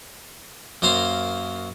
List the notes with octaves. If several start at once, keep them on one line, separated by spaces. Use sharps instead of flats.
F#2 A#3 C5 F5 A#5 C6